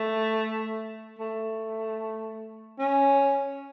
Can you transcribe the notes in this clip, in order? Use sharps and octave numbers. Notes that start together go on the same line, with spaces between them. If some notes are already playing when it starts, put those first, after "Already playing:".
Already playing: A3
A3
C#4